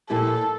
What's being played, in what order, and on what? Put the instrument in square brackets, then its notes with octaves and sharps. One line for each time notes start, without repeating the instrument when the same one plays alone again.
[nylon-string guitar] A#2 F3 A#3 E4 G4 [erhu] A4